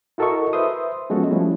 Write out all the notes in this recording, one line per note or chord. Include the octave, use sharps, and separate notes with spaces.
E4 F#4 A4 A#4 D#5 C#6
B4 C5 E5 C6 D#6
F3 G#3 B3 C#4 F#4 A4
F3 G3 A3 C#4 E4